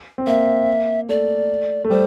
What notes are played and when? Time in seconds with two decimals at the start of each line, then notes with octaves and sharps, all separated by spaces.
0.18 C4
0.27 A#3 E5
1.09 A3 D5
1.85 A3
1.90 G3 C5